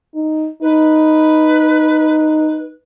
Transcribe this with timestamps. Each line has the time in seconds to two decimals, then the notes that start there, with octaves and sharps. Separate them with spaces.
0.14 D#4
0.62 D#4 B4